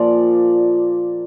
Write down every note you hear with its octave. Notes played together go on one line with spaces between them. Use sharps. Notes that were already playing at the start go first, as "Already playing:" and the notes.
Already playing: A#2 F3 D5